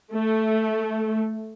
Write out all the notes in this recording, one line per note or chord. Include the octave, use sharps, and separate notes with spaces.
A3